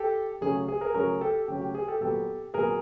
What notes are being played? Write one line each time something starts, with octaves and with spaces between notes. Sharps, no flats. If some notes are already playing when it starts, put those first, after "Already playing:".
Already playing: G4 A4
C#3 F#3 A3 C#4 G#4
G#4
G#4 A#4
C#3 F#3 A3 C#4 G#4 A#4
G4 A4
C#3 F#3 A3 C#4 G4
G4
G#4
G4 A4
A#2 F#3 B3 G4 A4
A#2 F#3 B3 G#4 A#4